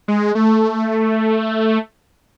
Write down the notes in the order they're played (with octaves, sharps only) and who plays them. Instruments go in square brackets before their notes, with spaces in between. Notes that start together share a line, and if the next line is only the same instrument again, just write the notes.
[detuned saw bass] G#3
A3